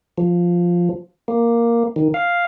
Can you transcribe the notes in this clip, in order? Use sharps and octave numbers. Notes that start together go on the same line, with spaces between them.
F3
A#3
D#3
F5